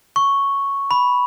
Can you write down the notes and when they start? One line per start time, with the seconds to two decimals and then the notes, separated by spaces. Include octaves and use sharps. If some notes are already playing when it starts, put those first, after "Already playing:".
0.16 C#6
0.91 B5